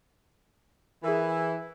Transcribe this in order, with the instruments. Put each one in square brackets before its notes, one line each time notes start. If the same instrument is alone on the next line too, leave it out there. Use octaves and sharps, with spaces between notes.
[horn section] E3 E4 [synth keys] G#4 A#4